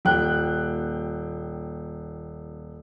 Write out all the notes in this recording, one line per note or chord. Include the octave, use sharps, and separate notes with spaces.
D#1 G5 F#6